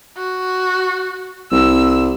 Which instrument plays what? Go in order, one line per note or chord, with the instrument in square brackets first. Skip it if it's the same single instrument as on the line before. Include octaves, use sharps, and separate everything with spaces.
[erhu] F#4
[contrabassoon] C2 [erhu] E6